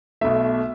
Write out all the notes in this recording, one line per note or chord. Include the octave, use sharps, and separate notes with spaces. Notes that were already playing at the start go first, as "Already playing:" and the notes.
B1 B2 A3 E5